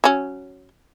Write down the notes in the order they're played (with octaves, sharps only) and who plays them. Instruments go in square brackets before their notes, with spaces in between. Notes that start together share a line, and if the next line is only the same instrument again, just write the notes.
[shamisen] F#3 C#4